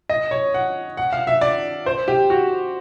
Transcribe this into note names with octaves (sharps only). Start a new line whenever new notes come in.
D#5
C#5
F#5
F#5
F5
E5
D5
C5
G4
F#4